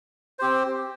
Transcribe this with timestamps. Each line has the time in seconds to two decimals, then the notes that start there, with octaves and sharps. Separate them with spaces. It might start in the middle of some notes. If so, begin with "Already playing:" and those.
0.39 C4 G4 C5